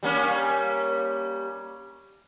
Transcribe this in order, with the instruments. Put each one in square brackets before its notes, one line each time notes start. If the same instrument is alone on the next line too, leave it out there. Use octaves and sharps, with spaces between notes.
[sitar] G3 A#3 C#4